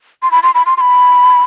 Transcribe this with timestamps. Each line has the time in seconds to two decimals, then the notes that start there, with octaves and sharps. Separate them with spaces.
0.23 C6
0.31 B5
0.43 C6
0.54 B5
0.66 C6
0.77 C6
0.81 B5